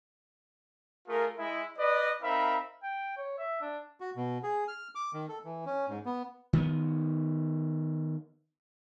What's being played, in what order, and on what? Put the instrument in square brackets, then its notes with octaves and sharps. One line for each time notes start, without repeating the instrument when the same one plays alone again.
[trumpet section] A3 F4 G#4 A#4
G#3 E4
B4 D5 D#5
C4 D#4 A#4 E5 F5 B5
[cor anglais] G5
C#5
E5
D4
[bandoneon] F#4
B2
G#4
F6
D6
D#3
A4
E3
C#4
G#2
B3
[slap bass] D#3 B3